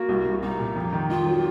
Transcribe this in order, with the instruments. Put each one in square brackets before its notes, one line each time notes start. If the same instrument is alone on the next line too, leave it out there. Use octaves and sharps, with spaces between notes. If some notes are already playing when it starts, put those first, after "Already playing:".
Already playing: [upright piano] A#3 [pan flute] F#4
[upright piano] C2
C2
[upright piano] C2 [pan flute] D#4
[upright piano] A#2
F2
D#3
[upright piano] D#3 [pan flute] F4
[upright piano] F#3